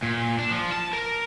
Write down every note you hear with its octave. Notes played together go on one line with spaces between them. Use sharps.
A#2
D4
F3
A5
A#4